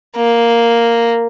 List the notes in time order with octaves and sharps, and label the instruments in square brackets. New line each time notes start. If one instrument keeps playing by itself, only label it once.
[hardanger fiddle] A#3